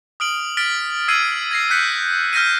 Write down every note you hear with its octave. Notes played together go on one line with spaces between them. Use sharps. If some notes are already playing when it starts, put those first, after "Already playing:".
D#6 F6 D7 F#7
F6 A6 B6 D7
E6 G#6 C7 D#7
G#6 A#6 C7
F#6 G6 B6 C#7
F6 G6 A#6 B6 D#7